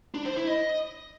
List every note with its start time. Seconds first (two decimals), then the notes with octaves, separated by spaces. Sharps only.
0.14 D4
0.25 C5
0.36 E4
0.48 D#5